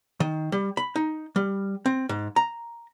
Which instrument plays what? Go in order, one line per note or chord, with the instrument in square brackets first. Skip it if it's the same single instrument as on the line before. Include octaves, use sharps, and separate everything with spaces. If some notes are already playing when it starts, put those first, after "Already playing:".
[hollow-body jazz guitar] D#3
G3
B5
D#4
G3
C4
G#2
A#5